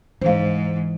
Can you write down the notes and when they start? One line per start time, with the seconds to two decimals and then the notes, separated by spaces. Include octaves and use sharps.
0.22 D1 G#2 E3 C5 F5